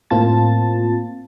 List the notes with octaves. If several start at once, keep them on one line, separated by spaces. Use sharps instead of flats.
A2 A#3 C4 F4 A5 A6